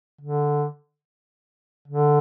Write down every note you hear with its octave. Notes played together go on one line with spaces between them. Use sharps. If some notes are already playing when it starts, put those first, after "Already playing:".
D3
D3